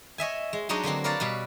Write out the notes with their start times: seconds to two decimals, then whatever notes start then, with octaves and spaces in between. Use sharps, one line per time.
0.18 C#5 D#5 E5 G#5
0.53 G#3
0.69 F#3 G#3 D4 D#4 C#5 D#5
0.83 D3 F#3 A#3 C4
1.04 A#4 B4 C#5 D5 F5 A5
1.20 B2 G3 B4